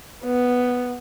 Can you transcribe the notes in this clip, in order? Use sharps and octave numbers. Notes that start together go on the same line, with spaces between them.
B3